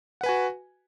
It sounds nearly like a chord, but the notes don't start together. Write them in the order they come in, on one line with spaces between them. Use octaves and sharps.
F#5 B4 G#5 F#4